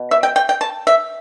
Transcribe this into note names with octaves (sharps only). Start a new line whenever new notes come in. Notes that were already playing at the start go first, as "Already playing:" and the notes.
Already playing: B2
E5
G5
G5
G5
A5
E5